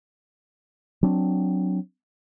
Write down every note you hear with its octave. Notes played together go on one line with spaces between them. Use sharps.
F#3 C4 D4